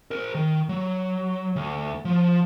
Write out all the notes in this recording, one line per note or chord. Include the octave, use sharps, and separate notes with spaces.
A#4 C5
D#3
F#3
D2
F3